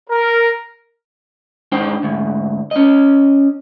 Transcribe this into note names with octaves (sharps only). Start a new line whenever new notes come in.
A#4
G#2 D4 D#4 C5 G5
D2 G#2
C#4 D#5